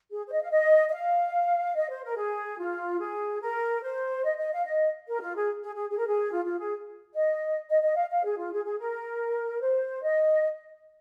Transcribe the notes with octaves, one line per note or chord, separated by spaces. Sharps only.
G#4
C5
D#5
F5
D#5
D#5
F5
D#5
C5
A#4
G#4
F4
G#4
A#4
C5
D#5
D#5
F5
D#5
A#4
F4
G#4
G#4
G#4
G#4
A#4
G#4
F4
F4
G#4
D#5
D#5
D#5
F5
F5
G#4
F4
G#4
G#4
A#4
C5
D#5